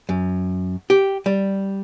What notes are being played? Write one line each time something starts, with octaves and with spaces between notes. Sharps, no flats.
F#2
G4
G3